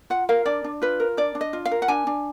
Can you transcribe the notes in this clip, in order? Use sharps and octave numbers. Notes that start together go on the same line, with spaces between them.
F4 F#5
A#4 F5
D4 D5
D4
F4 B4
A#4
D4 D5
D4
D#5
F4
F5
A#4
F#5
D4 G#5
D4